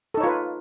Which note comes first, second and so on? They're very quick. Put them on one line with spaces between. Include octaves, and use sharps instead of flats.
A4 D#4 C#5 F4 B4